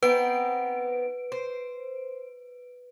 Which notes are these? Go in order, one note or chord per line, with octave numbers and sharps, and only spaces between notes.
B3 C4 D#4 B4 D7
C5